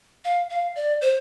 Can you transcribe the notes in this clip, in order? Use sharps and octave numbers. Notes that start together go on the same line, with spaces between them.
F5
F5
D5
C5